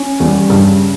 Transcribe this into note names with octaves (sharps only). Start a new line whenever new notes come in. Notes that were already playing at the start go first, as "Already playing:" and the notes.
Already playing: C#4
E2 G3
G2 C#3